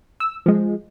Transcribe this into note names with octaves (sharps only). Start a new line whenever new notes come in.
E6
F3 G#3